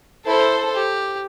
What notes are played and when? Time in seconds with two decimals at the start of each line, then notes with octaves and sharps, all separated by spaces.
0.26 E4 A4 C5
0.75 G4